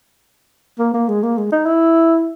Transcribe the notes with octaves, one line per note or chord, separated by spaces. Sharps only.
A#3
A#3
G#3
A#3
G#3
D#4
E4